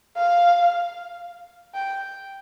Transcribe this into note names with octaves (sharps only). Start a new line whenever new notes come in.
F5
G5